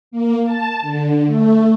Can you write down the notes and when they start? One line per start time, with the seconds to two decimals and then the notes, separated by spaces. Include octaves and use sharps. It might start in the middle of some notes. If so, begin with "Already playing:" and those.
0.11 A#3
0.44 A5
0.82 D3
1.27 A3